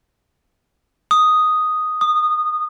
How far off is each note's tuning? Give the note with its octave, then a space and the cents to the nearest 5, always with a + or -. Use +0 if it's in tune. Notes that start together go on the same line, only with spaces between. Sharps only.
D#6 +0
D#6 -20